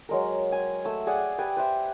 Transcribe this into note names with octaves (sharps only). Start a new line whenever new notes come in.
F#3 G#3 A#4
G#5
A3 E6
G#4 D5 F#5 G#5
G4 B4 D5 G#5
B4 C5 E5